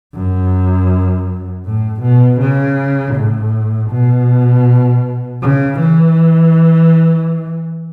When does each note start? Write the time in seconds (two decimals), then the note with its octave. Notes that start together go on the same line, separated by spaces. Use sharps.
0.14 F#2
1.65 A2
2.02 B2
2.40 C#3
3.15 A2
3.91 B2
5.42 C#3
5.80 E3